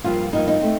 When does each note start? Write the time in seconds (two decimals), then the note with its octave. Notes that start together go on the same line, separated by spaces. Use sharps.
0.04 G2 F3 A#3 F4
0.33 G2 F3 A#3 D#4
0.48 D#4
0.61 A3 C4